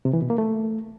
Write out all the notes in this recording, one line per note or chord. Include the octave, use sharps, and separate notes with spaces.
C3
E3
B2
A#3
A3